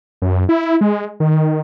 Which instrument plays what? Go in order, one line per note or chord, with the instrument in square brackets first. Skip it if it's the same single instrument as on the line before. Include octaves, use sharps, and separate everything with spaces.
[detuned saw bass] F#2
E4
G#3
D#3